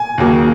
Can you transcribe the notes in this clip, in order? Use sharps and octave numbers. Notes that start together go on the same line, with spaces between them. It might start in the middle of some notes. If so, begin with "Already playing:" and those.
Already playing: G#5
D#2 C#3 F#3 A#3